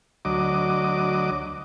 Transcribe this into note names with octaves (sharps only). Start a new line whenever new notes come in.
D2 F#3 D#5 D6